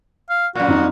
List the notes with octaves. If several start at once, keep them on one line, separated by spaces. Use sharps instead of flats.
F5
F#2 A#2 F#4
F2 D#4